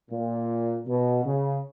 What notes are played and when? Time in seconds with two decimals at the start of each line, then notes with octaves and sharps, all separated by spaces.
0.11 A#2
0.87 B2
1.25 C#3